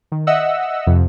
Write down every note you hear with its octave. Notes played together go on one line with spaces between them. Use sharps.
D#3
D#5 E5 F#5 E6
F2 C3